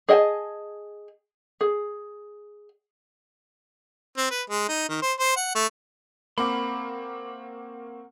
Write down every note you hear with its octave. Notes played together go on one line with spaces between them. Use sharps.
G#4 D#5 F#5 G#5 A5
G#4
C4
B4
G#3
D#4
D#3
C5
C5
F#5
A3
A#3 C4 A#4 F#5 B5 C#6 D6